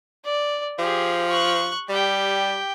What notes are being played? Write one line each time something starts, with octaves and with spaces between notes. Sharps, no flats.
D5
F3 G4 G#4
C#6 F#6
G3 G4 G5